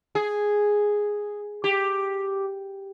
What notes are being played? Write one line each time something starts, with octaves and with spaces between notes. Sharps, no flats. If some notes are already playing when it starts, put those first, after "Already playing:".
G#4
G4